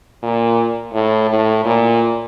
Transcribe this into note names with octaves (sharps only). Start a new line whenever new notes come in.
A#2
A2
A2
A#2